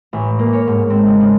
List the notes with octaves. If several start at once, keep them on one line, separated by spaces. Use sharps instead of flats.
A1
A#3
C#5
G#2
C4
C#3
C#3